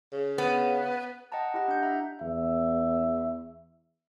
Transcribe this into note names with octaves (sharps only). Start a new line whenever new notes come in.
C#3
B3
D#5 F#5 G5 A5 A#5
E4 G4 D#5 F#5
D4 G6
E5 G5 A#5
E2 E5